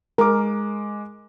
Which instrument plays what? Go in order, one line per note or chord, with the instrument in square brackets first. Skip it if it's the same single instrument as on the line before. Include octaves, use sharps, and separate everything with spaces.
[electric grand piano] G#3 D6 [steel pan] A#4